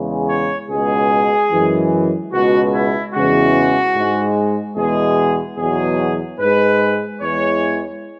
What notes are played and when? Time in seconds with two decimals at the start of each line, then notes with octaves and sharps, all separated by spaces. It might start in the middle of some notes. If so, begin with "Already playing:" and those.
Already playing: E2 C#3 G#3
0.29 C#5
0.69 C#2 B2 G#3 G#4
1.51 F#2 E3 G#3
2.32 C#2 B2 G#3 F#4
2.72 E4
3.13 E2 C#3 E3 G#3 F#4
3.95 G#2 G#3
4.77 E2 B2 G#3 G#4
5.58 E2 B2 F#3 G#4
6.39 G#2 G#3 B4
7.21 E2 E3 G#3 C#5